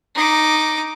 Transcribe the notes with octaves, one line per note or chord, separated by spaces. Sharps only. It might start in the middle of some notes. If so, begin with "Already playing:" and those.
D#4 D6